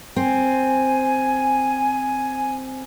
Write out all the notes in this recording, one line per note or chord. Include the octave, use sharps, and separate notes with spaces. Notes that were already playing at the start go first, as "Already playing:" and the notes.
C4 G#5